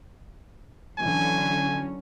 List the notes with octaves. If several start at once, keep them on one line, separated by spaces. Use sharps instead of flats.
D3 E3 F#3 C#4 G#5